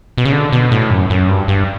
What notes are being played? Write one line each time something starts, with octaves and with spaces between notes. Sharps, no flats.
B2
C#3
D3
B2
A2
F#2
F#2
G2
G2